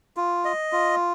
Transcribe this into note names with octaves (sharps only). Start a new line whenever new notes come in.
F4
D#5
F4